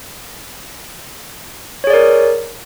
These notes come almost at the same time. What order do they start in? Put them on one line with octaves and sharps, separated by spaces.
C#5 G#4 D5 A#4